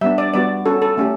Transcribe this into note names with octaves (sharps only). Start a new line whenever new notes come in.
G3 B3 D4 E5
D5
G3 B3 F#4 D5
C#4 F#4 A4
A4
A3 C#4 G4